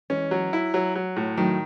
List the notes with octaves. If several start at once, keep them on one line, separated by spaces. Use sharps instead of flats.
E3 G#3 C#4
F#3
E4
F#3
F#3
A2
D#3 F#3 A3